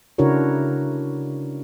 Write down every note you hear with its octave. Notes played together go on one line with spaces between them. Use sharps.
C#3 D4 E4 F#4 A#4 C#5